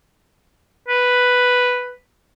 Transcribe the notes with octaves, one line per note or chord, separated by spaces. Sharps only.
B4